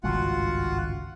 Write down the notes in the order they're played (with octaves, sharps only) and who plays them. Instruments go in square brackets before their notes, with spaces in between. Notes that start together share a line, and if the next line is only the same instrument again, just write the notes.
[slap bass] G#1 C#2 G2 [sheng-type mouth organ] F4 F#4 F#5